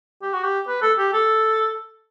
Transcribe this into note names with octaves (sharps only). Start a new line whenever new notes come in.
G4
F#4
G4
B4
A4
G4
A4